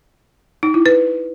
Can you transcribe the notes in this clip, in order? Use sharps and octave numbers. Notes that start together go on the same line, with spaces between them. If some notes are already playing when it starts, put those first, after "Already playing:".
D#4
E4
B4